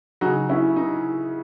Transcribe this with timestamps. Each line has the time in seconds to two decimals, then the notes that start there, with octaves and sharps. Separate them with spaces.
0.21 C#3 F#3 D#4 F#4
0.49 C#4 E4
0.76 D#4